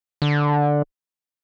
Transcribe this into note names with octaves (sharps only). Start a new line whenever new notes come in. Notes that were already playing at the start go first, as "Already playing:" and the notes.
D3